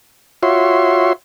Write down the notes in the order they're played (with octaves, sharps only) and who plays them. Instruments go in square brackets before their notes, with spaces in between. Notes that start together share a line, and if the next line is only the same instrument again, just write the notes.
[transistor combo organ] F4 F#4 C#5 E5 C6